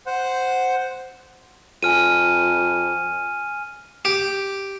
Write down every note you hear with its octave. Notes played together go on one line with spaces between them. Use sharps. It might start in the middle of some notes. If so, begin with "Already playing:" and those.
C5 F#5
F2 G#5 F6 D#7
G4